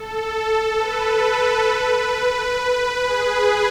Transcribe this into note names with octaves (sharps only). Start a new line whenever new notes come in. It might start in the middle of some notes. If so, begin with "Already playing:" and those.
Already playing: A4
B4
B4
G#4